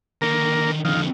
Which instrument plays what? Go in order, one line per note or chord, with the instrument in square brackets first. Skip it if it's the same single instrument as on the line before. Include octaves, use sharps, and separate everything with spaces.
[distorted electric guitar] D3 D#3 [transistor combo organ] A#3 A#4
[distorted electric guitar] F2 D3 [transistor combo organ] D#3 F5